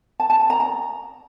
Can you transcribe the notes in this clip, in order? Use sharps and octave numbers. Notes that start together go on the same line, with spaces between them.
A5
A5
A5
A#5
A#5